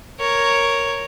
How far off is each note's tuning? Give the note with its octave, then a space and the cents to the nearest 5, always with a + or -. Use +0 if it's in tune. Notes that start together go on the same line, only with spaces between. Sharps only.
A#4 +0 C#5 +0